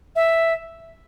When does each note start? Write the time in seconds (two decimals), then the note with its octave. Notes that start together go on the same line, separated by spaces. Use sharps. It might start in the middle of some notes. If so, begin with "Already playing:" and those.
0.16 E5